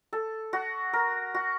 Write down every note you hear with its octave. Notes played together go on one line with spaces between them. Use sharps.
A4
F#4
A#4
F#4